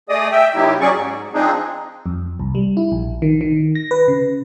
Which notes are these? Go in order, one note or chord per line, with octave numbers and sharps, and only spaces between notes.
A3 G#4 D5 D#5 D#6
E5 G5
C3 F#3 A#3 D#4 E4 G4
F#3 C#4 G#4 D5 C#6
G#2
F3 C4 D4 D#4 G#4
F2
C2
G3
E4
A#1
D#3
D#3
A#6
B4
C#3